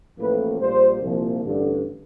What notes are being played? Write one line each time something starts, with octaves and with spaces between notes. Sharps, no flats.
A1 A2 F3 A#3 B4
A#1 A#2 G3 C5
C2 A#2 F3 A#3
A1 G2 D3